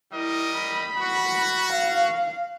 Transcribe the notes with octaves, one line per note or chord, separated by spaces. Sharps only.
G3 E4 A#4 D#5
B5
F#4
F5